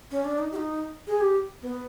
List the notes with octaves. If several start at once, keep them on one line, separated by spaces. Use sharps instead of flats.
C#4
D4
D#4
G4
D#4
G#4
G4
B3